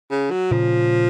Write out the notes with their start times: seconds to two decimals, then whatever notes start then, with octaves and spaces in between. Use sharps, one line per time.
0.11 C#3
0.31 F#3
0.51 A#2 C#3 F3